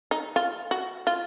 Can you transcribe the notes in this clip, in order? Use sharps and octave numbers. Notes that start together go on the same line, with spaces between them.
D#4
F4
F#4
F4